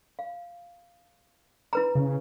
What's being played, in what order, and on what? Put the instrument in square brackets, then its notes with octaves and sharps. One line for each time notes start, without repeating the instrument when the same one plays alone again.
[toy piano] F5
E4 B4 A#5
[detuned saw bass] C#3